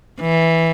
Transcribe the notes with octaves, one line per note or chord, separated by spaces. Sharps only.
E3